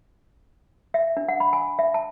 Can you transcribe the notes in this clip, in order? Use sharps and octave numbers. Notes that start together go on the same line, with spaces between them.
E5
D4
F#5
B5
G#5
E5
A5